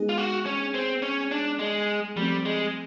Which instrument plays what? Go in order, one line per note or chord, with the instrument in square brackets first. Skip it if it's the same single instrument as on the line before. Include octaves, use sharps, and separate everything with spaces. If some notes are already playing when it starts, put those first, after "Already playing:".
Already playing: [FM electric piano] G#3 B3 D#4 G#4
[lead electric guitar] F4
F#4
C#4
C4
C#4
D4
G#3
[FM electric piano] F3 A3 C4 [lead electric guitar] G3
[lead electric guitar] G#3